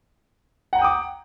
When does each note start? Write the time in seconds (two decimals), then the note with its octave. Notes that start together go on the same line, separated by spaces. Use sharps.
0.73 F#5
0.76 A#5
0.79 G5
0.82 D#6
0.84 D6